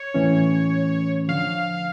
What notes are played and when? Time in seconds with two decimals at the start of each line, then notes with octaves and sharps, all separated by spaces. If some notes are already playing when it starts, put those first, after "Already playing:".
Already playing: C#5
0.14 A2 E3 A3 C#4
1.28 D3 F3 F5